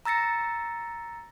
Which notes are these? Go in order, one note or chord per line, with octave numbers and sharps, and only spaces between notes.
A#5 E6 A6 A#6 C#7